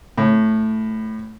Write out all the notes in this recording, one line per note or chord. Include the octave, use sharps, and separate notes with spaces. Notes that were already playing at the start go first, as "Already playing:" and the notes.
A2